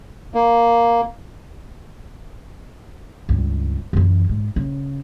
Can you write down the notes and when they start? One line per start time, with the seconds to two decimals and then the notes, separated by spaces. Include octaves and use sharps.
0.34 A#3
3.29 C#2 G2
3.93 F#2 E3
4.29 G#2
4.56 C#3